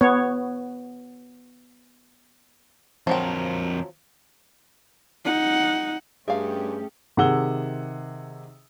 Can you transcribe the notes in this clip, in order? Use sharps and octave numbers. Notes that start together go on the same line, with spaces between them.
B3 C#5
F2 F3 F#3 C4 A#4
D#4 F#5
G2 A3 C#4 G4 G#4 E5 F5
C3 D#3 G#4 F#5 E6 G7